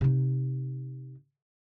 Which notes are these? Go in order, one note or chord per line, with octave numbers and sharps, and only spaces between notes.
C3 D#4